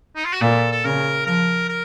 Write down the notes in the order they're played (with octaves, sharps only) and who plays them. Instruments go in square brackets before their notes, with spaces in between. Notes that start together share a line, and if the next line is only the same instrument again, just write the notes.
[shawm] D#4
F4
F#4
[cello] A#2 [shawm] A4
[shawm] A4
[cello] C#3 [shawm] A#4
[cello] F3 [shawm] A#4
[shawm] A#4